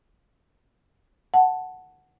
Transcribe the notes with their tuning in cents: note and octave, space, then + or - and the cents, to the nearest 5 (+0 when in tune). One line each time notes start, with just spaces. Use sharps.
F#5 +0 A5 +0